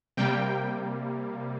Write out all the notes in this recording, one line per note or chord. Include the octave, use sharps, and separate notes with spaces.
C3 G3 A#3 G5